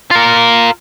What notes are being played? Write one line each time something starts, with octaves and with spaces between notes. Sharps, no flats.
F4 A#4